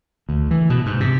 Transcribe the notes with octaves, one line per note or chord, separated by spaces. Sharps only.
D2
E3
B2
G#2
C3